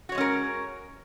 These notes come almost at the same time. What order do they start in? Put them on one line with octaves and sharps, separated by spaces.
F#4 C#5 G#3 C#4 A#4